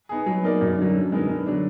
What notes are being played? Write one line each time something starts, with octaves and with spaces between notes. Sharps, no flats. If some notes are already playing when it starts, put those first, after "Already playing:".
B3 D#4 G#4
F#3
A#3 D#4 A#4 D5
F#2
D3 F#3
D3
G#3 B3 D#4 A#4
D3
F#3 D4